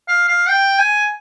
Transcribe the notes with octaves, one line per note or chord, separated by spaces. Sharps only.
F5
F5
G5
G#5